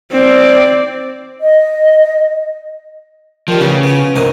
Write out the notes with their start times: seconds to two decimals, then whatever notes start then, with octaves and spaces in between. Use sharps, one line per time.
0.11 C4 D5
1.41 D#5
3.48 D#3 F3 G3
3.61 A2 C#3 E3
3.83 B3 F4
4.16 C2 G2 A#4 C5 D#5